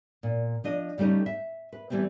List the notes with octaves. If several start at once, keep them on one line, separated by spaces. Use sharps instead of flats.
A#2
F3 D4 D#5
C#3 G3 A3 C#4 D#4
E5
B4
E3 G3 A3 B3 C4